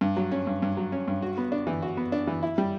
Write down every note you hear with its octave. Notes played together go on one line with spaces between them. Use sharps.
G2
F#3
C#4
G2
G2
F#3
C#4
G2
F#4
B3
D4
E3
F#4
B3
D4
E3
E4
G3